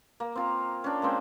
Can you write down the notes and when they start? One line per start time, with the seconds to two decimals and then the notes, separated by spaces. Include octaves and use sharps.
0.20 A#3
0.35 C4 F4 A#5
0.84 C#4 D4
1.02 G#3 A#3 C4 G5